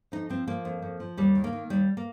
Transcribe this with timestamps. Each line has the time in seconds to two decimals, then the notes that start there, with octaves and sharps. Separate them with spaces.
0.12 F2 D#4
0.30 F3 C4
0.47 F3 A#3
0.65 F2
0.82 F2
1.00 F3
1.17 D#2 G3
1.35 D#3
1.44 A#3
1.53 D#3
1.70 D#2 G3
1.97 A#3